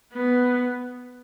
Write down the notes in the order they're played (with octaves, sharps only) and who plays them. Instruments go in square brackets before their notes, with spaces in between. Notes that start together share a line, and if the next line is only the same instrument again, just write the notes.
[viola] B3